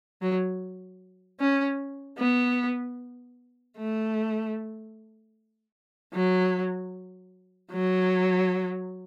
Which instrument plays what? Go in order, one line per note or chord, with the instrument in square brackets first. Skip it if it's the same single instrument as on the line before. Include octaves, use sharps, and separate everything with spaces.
[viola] F#3
C#4
B3
A3
F#3
F#3